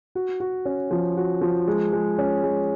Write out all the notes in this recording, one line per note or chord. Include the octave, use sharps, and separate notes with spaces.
F#4
F#4
C#4
F3
F#4
F3
G#3
G#3
C#4
G#3